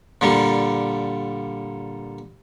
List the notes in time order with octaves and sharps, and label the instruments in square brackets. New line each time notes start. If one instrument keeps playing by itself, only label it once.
[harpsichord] A#2 D3 G3 A#3